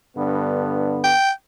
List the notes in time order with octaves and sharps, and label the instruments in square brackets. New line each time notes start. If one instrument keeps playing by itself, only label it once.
[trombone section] G2 D3 B3
[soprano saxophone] G5